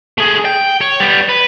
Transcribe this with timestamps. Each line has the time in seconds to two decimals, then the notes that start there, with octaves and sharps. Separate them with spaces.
0.18 A3 G#4
0.45 G5
0.81 C#5
1.00 G3 B3
1.29 B4